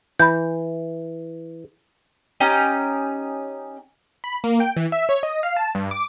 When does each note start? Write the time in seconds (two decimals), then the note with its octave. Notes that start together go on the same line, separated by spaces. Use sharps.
0.20 E3 B5 G6
2.41 C#4 D#4 G4 G5
4.24 B5
4.44 A#3
4.60 G5
4.77 E3
4.92 E5
5.09 C#5
5.23 D#5
5.43 F5
5.57 A5
5.75 G2
5.91 D6